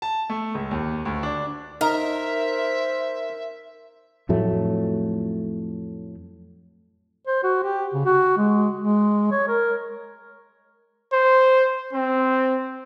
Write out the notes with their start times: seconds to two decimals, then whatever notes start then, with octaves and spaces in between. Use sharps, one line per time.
0.02 A5
0.30 A3
0.55 C#2
0.71 D#2
1.05 D2
1.23 D4
1.81 D#4 A#4 C5 E5
4.29 F2 A2 F#3 A3
7.27 C5
7.43 F#4
7.63 G4
7.93 C#3
8.06 F#4
8.37 G#3
8.80 G#3
9.32 C#5
9.48 A#4
11.12 C5
11.93 C4